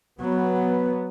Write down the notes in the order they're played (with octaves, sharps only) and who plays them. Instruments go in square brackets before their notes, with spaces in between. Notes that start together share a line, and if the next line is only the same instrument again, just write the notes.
[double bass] F#3 [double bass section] B3